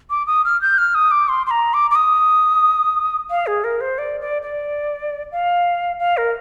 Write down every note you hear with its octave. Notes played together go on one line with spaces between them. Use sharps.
D6
D#6
F6
G6
F6
D#6
D6
C6
C6
A#5
D6
D6
D#6
F5
G#4
A#4
C5
D5
D5
D5
F5
F5
A#4